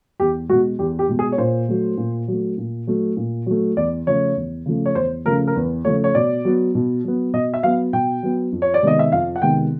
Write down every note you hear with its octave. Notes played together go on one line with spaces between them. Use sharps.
E2 G4
B2 G#3 F#4
E2 G4
G4
B2 G#3
G#4
C#5
A#2 C5
F#3 A3
A#2
F#3 A3
A#2
F#3 A3
A#2
F#3 A3
E2 D5
C#3 F3 A3 C#5
E2
C#3 F3 A3
C#5
E2 C5
C#3 F3 A3 A#4
A#4
E2 B4
C#3 F3 A3 C#5
C#5
B2 D5
F#3 B3
B2
F#3 B3
B2 D#5
E5
F#3 B3 F5
B2 G5
F#3 B3
F2
C#5
D5
C3 D#3 G#3 B3 D#5
E5
F2 F5
F#5
C3 D#3 G#3 B3 G5